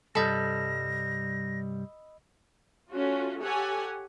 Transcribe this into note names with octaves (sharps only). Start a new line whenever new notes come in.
C2 G2 G3 A4 D#5 B5 E6 A#6
A3 C#4 F4 F#4
G4 A4 C#5 F#5 G#5